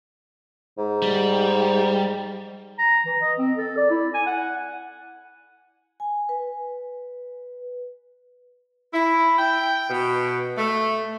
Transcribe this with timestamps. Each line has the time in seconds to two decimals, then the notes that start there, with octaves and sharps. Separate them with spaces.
0.78 G#2
1.02 G3
2.78 A#5
3.06 E3
3.21 D#5
3.38 C4
3.57 A4
3.77 D5
3.90 E4
4.14 G#5
4.26 F#5
6.00 G#5
6.29 B4
8.93 E4
9.38 G5
9.89 B2
10.57 A3